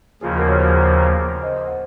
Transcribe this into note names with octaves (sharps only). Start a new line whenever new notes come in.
D#2 C#3 F3 A#3 F4 G#4
F#4 A#4
C#5
G#4 C5
G#4 C5
C5 D#5
F#5